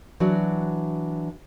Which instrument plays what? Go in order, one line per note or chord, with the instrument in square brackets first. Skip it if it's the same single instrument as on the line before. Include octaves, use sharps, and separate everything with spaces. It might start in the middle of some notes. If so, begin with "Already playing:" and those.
[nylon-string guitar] E3 F#3 D4 F#4 D5